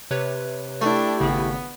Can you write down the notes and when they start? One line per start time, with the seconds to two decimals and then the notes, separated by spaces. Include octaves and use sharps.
0.11 C3 B4 C#5
0.82 A3 D4 E4 G4
1.20 G#1 C#3 B3